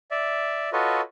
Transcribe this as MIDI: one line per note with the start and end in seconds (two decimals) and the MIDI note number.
0.11 0.70 74
0.11 0.70 76
0.73 1.01 65
0.73 1.01 66
0.73 1.01 69
0.73 1.01 71
0.73 1.01 73
0.73 1.01 75